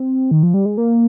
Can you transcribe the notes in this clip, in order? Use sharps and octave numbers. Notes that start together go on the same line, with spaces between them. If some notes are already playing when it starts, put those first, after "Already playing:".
Already playing: C4
D#3
F3
G3
G#3
A#3